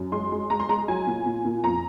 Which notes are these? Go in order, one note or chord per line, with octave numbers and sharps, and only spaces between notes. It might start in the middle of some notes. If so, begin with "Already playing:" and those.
Already playing: F#2
G#3 C6
G#3
G#3 A#5
C6
G#3 A#5
F#3 G#5
A#2
A#2
A#2
F2 A#5